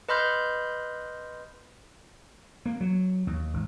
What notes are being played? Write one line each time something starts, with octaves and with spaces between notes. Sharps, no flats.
B4 D#5 B5 C6 F6 G6
A#3
F#3
D#2
G#1